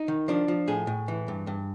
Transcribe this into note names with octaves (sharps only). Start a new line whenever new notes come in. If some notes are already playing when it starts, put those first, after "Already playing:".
Already playing: D#4
D#3
F3 D4
F3
A2 G#4
A2
E3
G2
G2